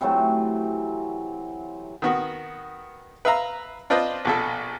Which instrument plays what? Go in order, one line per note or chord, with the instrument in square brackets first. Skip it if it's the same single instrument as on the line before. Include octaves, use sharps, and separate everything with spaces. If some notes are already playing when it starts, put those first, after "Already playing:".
[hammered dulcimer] C3 E3 F#3 A3
[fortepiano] D#3 B3 F#4
B4 E5 F5 A#5
D4 F4 B4 C5 D#5
A#1 B2 A4